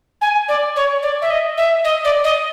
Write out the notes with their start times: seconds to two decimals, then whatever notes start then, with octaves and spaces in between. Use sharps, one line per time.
0.21 G#5
0.48 D5
0.76 C#5
1.02 D5
1.22 E5
1.30 D#5
1.57 E5
1.84 D#5
2.04 D5
2.24 D#5